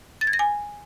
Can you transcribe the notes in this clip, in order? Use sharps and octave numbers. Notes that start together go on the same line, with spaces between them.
A6
G#6
A#6
G#5